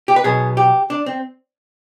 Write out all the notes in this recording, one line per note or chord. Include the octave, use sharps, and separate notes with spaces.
G4
B4
B1 B2 B3 G#4
G4
D4
C4